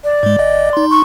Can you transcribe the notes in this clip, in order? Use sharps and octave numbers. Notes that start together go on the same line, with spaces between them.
D5
G#2 G#3
G1 D#5
D#4 C6
C#6